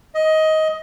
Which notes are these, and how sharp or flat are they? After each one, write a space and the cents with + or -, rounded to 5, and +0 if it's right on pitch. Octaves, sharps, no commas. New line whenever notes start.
D#5 +15